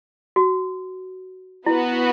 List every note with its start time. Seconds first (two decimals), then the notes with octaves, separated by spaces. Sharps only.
0.36 F#4
1.66 B3 E4 F#4 B4